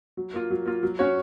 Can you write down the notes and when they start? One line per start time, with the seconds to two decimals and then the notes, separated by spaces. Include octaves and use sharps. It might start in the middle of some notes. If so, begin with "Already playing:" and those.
0.17 F#3
0.34 A#3 F4
0.50 F#3
0.66 A#3 F4
0.83 F#3
0.99 C#4 F#4 C#5